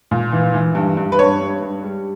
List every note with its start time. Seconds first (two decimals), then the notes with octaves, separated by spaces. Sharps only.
0.11 A#2
0.32 E3
0.54 E3
0.75 G2
0.97 G2
1.12 B4
1.19 G2 C#5
1.41 G2
1.62 G2
1.84 G3